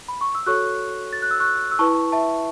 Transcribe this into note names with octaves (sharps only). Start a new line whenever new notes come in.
B5
C#6
E6
F#4 A4 C#5 C#6 F#6
A6
F#6
E6
C#6 F#6
E6
E4 B4 A5 C#6
E5 A5